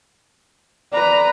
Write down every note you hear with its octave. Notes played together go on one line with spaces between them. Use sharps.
B4 D5 A#5